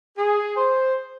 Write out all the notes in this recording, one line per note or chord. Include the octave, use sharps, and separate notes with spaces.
G#4
C5